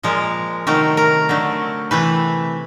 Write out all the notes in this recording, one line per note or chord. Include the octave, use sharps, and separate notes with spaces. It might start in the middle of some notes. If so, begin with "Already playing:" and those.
A#2 F3 G#3 A#4
C3 D#3 F#3 A3 A#4
A#4
D3 F#3 A3
C3 E3 A3 B4